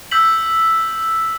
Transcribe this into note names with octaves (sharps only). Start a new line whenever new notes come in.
E6 G6 B6 F#7